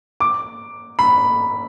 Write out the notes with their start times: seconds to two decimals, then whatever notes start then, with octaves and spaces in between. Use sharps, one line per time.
0.20 D6
0.99 B5